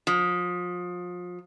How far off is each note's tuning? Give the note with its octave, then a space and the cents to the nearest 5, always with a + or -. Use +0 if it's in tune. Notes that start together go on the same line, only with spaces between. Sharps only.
F3 +30